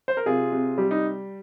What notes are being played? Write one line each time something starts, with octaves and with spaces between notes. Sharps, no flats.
C5
A#4
C3 F4 G#4
C3
G3
D#4